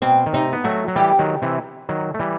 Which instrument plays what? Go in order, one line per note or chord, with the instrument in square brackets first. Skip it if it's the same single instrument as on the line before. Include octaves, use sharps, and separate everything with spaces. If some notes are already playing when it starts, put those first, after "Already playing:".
[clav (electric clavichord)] B2 [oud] C4
[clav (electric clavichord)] D#3
[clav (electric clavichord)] C3 [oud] D#4
[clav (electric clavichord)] B3
[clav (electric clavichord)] F#3 A3 [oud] F#4
[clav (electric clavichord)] F#3
[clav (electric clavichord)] E3 G3 [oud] G4
[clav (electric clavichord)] D#3 F#3
C3 E3
D#3 F#3
A3
E3 G3